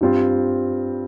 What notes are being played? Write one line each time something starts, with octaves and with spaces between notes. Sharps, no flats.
G2 G3 C4 F4 C5